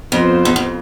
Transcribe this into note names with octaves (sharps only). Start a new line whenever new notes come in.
F2 B3 F4 C5
E2
F2